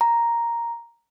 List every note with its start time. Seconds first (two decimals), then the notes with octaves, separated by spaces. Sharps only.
0.01 A#5